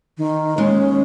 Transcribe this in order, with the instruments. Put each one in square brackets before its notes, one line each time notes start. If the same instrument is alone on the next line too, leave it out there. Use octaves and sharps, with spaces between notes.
[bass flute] D#3
[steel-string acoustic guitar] D#2 G#3 [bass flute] C#4